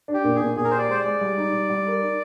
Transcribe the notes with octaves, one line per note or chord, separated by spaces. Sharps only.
D4
G4
A#2
G#4
A#2
A#2 G#4
A#4
G4 C5
D5
G#3 C5
D5
G#3
G3
D#4
G3
G3
A#4
D#4